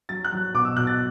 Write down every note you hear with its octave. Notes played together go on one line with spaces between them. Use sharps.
F#3 A6
F#6
F#3
B2 D6
E6
B2 F#6
A6